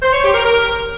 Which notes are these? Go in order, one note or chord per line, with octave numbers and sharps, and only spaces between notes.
C5
C#5
G4
A#4
A#4